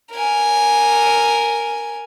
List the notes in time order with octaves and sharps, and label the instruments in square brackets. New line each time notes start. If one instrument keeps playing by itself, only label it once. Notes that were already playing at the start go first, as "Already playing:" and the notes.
[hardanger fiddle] A#4 G#5